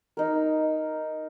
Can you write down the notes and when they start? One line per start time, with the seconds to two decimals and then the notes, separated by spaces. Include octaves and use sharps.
0.17 D#4 A#4